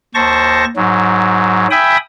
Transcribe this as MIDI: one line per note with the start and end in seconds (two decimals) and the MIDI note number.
0.15 0.65 39
0.15 0.65 72
0.15 0.65 81
0.15 0.65 85
0.15 0.65 94
0.76 1.67 44
0.76 1.67 54
1.71 1.97 76
1.71 1.97 79
1.71 1.97 80
1.71 1.97 83
1.71 1.97 87